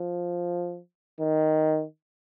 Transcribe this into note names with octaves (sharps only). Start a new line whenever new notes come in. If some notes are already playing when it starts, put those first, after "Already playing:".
Already playing: F3
D#3